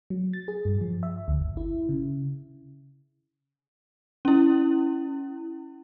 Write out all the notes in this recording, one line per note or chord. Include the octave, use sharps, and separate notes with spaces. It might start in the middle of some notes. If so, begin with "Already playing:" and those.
F#3
A6
G#4
G2
F3
E5
D2
G1
E4
C#3
C#4 E4